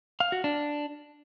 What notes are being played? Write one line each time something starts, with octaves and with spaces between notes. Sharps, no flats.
F5
F#4
D4